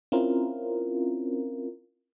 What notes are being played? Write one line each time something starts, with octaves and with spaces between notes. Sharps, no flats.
C4 C#4 E4 F4 A#4